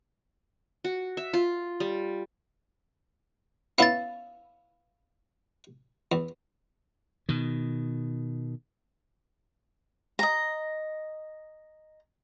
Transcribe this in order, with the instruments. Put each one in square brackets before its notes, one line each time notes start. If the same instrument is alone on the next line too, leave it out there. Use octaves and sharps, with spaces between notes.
[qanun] F#4
E5
F4
G3
[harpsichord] B3 C#4 E4 [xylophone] F5 A6
[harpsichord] E2
[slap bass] B2 D#3
[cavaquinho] D#5 A#5